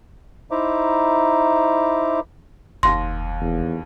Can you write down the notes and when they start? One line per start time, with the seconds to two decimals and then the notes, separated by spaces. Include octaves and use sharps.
0.51 D#4 E4 C5 E5 A#5 D6
2.83 F1 D#2 C6 A#6
3.41 E2